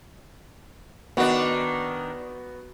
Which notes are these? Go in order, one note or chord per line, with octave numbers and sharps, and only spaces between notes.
D#3 B3 D4 F#4